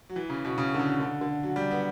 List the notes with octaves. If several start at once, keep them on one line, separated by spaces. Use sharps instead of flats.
F#3
E3
C#3
B2
C#3
D3
C#3
D3
D3
F#3
G3
B3